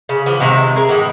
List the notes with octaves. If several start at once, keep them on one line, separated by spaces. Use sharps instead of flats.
C#3
E3 F3 B4
C3 D#3 G#3 E4
G#4 A#4
A2 E3 G#3